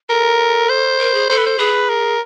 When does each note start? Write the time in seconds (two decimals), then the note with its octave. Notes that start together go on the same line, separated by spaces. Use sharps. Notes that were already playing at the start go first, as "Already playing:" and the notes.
0.09 A4 A#4
0.69 C5
0.99 A#4
1.14 G#4
1.29 A4 C5
1.37 B4
1.46 C5
1.58 G#4 B4
1.89 A#4